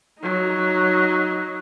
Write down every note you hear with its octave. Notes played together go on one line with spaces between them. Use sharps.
F#3 D#4